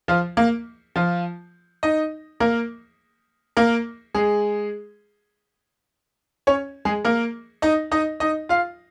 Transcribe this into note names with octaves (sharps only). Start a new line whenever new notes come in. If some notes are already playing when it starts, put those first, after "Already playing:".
F3 F4
A#3
F3 F4
D#4 D#5
A#3 A#4
A#3 A#4
G#3 G#4
C#4 C#5
G#3 G#4
A#3 A#4
D#4 D#5
D#4 D#5
D#4 D#5
F4 F5